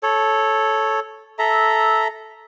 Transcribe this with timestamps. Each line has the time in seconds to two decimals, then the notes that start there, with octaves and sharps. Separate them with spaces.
0.03 A4 C#5
1.39 A4 E5 A#5